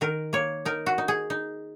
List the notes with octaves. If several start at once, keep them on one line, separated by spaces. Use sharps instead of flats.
D#3 A#4
A#3 C#5
D#4 A#4
F#4
D#4
G#4
D#4